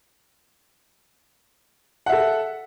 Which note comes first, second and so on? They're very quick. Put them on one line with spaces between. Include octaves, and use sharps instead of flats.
F#5 E5 A4